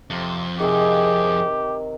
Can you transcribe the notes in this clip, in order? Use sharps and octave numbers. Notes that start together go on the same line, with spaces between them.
F2 C3
C3 D#3 G4 G#4